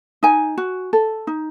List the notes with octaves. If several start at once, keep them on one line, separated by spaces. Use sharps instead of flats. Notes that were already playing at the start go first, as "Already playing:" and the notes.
D#4 G#5
F#4
A4
D#4